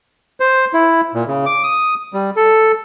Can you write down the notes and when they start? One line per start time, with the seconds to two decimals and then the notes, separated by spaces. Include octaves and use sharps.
0.40 C5
0.74 E4
1.14 A#2
1.27 C#3
1.46 D6
1.63 D#6
2.13 G3
2.36 A4